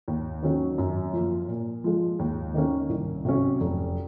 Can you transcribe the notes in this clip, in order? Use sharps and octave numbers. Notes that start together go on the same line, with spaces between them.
D#2
D#3 F#3 C#4
F#2
F3 A#3
A#2
F3 G#3
D#2
D#3 A#3 C#4
C2
C3 F#3 C#4
F1